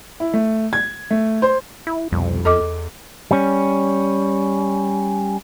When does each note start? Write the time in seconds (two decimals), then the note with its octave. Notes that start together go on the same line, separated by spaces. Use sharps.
0.20 E4
0.34 A3
0.73 G#6
1.10 A3
1.42 C5
1.87 E4
2.12 C2 F2 B2 G3
2.45 E2 A4 D#5 D6
3.31 G3 C#4